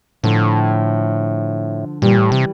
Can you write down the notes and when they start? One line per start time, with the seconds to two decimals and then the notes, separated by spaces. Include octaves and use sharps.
0.23 A2 D3 F3
2.02 A#2 E3 G3
2.18 A2
2.32 C3